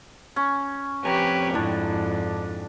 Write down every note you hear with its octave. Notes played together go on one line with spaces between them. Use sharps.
C#4
F2 C4 G4 B4 C#5 G#5 A#5 C#6
F2 G#2 D4 E4 D5